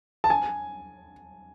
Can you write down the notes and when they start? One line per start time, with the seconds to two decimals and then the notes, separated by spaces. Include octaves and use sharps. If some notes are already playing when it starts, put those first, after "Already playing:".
0.24 A5
0.30 G#5